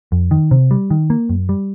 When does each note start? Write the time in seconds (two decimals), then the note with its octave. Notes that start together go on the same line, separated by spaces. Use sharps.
0.12 F2
0.31 D#3
0.51 C3
0.71 G3
0.90 D#3
1.10 A#3
1.29 F#2
1.49 G3